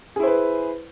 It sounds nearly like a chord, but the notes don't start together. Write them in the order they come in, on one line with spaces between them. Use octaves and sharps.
G#4 E4 C5 B4